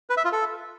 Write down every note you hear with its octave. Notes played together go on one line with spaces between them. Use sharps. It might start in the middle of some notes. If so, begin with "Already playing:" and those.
B4
E5
F4
A4